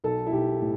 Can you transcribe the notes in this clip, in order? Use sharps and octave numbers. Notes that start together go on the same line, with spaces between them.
B1 A4
E4
B1 G4
A2